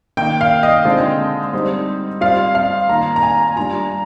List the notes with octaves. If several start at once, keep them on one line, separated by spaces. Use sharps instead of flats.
D#3 A#3 D#4 G5
F5
D#5
D3 G#3 C4 F4
G3 C4 D#4
G3 C4 F4 F5
F5
D#3 A#3 F4 A#5
A#5
G#5
G3 D4 F4 A#5